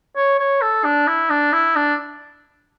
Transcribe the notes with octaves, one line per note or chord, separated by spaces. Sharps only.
C#5
C#5
A4
D4
E4
D4
E4
D4